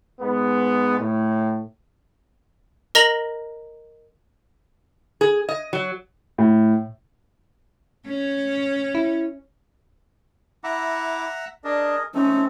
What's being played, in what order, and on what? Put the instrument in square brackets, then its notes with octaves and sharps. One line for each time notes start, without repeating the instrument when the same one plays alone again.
[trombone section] G#2 G#3 B3
A2
[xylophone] A#4 D#5 A#5 A#6 F7 F#7
[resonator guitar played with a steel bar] G#4
D#5
F#3
[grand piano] A2
[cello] C#4 C#5
[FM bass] E4
[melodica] E4 D6 [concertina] E5 F#5 A#5
[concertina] D4 [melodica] G#4 A#4 D#5
[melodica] A3 C4 A4 [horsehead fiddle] C#4 [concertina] D#4